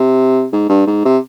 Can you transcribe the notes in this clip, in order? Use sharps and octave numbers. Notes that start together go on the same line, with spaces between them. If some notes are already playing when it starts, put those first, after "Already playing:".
Already playing: C3
G#2
G2
G#2
C3